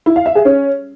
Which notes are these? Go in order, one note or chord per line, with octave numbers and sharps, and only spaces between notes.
E4
F5
E5
G#4
C#4